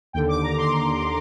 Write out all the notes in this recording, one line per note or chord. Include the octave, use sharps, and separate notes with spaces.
D#2 D3 G5
D6
A#5
C6